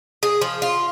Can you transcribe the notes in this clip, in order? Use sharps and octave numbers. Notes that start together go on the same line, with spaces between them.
G#4
F3
F4